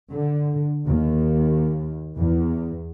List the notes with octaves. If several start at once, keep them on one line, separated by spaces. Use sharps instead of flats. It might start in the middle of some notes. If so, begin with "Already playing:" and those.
D3
D#2
E2